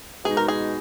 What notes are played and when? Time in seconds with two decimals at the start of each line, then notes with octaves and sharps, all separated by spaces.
0.25 B2 G#3 D#4 G#4
0.37 A#4
0.48 G#4